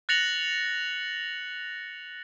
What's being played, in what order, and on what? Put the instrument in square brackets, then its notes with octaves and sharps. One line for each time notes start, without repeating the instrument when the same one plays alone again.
[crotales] F#6 A6 A#6 C#7 F7 F#7